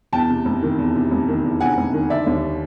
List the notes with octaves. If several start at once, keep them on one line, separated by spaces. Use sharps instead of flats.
E2 G5 A5
C3
F1
D#3
E2
C3
F1
D#3
E2
C3 F#5 G#5
F1
D#3
D3 D5 E5
D#2